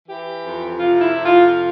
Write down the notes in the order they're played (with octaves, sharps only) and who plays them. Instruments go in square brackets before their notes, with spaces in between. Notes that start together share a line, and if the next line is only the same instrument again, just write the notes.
[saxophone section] E3 G4
F2
C3 F4
E4
F2
F4
F4